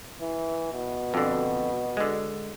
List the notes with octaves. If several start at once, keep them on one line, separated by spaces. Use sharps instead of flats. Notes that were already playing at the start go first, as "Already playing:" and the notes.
E3
B2
F2 D3
D3 G#3